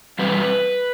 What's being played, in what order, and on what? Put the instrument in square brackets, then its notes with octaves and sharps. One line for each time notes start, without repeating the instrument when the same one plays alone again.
[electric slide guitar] E2 B2 G3 C4 B4